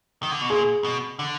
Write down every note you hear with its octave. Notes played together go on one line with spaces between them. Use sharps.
D#3
D3
B2
A#2 G#4
B2
D3